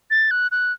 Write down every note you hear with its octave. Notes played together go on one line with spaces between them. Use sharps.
A6
F#6
F#6